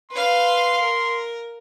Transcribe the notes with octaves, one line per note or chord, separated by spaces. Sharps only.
B4 F5 C6
A#4